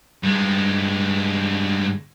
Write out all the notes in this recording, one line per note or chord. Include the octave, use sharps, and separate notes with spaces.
G2 G#3